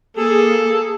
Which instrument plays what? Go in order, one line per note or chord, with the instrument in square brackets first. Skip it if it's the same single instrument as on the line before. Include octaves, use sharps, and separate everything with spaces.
[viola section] A#3 G#4 [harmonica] A4